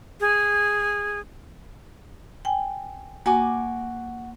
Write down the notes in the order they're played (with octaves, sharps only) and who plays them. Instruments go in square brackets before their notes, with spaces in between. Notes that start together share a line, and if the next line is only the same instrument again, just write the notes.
[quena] G#4
[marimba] G5 G#5
[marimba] A#3 [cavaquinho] F#4 G#5 D6